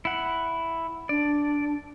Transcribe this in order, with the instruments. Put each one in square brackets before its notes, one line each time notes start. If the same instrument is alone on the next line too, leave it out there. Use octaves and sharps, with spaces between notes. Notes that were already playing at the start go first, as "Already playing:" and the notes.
[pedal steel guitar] E4 F#5
[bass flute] D4 [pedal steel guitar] D5